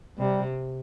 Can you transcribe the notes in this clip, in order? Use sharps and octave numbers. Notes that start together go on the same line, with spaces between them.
C3 G3